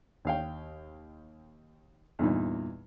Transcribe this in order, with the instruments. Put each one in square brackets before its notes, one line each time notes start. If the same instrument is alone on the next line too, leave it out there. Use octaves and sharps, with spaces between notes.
[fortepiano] D#2 F5 G5
E2 G2 A#2 D#4